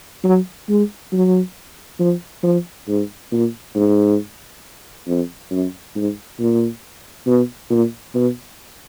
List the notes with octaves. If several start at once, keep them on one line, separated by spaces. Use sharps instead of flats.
F#3
G#3
F#3
F3
F3
G#2
A#2
G#2
F2
F#2
G#2
A#2
B2
A#2
B2